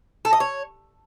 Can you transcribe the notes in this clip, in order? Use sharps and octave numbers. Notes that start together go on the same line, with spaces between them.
A4
D#5
C#5